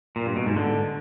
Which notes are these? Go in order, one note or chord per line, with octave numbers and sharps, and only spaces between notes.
A#2
G2
B2
G#2
D3